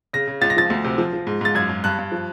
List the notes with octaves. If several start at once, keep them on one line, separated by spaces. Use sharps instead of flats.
C#3 A#6
C#3
C#2 A6
A#6
F3 A6
D2
C3
F3
F3
G#2
G#2 A6
F#2 G#6
F#2
G2 F#6
G2
F3